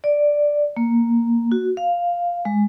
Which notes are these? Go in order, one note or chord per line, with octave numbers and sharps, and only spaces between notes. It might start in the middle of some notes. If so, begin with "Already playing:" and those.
D5
A#3
F#4
F5
G#3